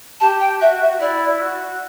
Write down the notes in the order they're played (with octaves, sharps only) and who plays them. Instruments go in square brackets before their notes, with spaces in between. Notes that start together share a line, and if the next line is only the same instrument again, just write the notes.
[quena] G4 [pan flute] A5
[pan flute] G5
[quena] F#4 [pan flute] E5
[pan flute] E5
[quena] E4 [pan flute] D5
[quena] F#4